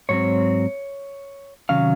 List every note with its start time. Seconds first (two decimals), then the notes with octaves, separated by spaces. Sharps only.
0.09 G#2 F#3 C4 C#5
1.69 C3 D#3 F#3 C#4 F5